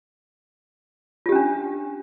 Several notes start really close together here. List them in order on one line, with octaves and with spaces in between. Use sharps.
F4 G4 C#4 D4